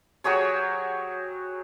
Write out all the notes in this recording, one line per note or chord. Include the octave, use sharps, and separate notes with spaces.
F#3 G4 G#4 C#5